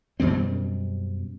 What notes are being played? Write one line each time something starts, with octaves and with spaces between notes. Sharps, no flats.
F#2 B2 G3 C4